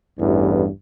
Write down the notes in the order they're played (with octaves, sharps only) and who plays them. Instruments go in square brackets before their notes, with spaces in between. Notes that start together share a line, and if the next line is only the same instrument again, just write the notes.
[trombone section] A1 E2 G2